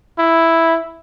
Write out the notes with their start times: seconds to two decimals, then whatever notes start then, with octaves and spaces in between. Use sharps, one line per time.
0.18 E4